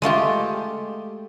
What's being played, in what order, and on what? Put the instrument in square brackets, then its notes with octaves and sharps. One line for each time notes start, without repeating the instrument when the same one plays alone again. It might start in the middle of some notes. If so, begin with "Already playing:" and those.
[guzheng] G#3 A3 F4 G4